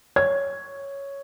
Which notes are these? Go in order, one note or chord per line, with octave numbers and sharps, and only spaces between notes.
C#5 G#6